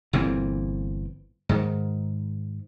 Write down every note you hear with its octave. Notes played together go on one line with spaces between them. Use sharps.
G1 A#2 E3 C4
G#2 D#3